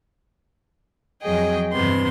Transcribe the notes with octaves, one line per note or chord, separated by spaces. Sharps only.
F2 F#3 G#4 D#5 G5
E2 G2 C3 B3 C6